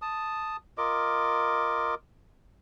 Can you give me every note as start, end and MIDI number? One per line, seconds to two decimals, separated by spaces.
0.02 0.57 81
0.02 0.57 87
0.78 1.95 65
0.78 1.95 70
0.78 1.95 75
0.78 1.95 86